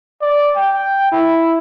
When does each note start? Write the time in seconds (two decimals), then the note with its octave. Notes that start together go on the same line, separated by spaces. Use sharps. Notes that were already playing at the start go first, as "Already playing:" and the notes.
0.22 D5
0.56 G5
1.12 E4